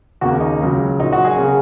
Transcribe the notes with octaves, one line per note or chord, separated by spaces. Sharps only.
D#2 C#3 A#3 F#4
D#4
C#2 C#3 F#3
A#2 F#3 A#3 D#4
F#4
G#4
C#3 A#3